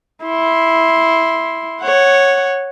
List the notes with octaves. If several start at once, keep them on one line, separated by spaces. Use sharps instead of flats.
E4 C6
C#5 F#5